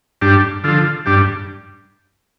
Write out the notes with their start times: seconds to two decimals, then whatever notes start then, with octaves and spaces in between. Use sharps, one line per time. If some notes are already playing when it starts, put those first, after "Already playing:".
0.22 G2 D4 G4
0.64 D3 F3 F4 A4
1.06 G2 D4 G4